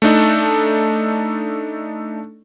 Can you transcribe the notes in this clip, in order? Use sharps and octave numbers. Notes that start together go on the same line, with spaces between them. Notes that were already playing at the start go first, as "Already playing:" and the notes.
A3 D4 D#4 A4